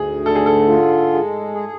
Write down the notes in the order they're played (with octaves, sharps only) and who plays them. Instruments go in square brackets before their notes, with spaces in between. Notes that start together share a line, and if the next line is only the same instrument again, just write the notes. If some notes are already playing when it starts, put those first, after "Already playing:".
Already playing: [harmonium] D2 [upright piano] G#4
[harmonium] D3 [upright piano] A4
[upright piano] G#4
A4
[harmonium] F4
G#3
G#4